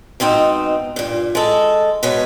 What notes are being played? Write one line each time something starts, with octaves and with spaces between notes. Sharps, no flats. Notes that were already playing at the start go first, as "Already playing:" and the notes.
G#2 B2 C4 C#4 D#4
G2 A#2
G#3 A4
B2 G#3 B4 C#5